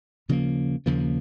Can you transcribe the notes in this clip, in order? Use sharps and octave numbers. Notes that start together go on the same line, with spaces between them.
D#2 C#3 F3 A#3
D#2 C#3 F3 A#3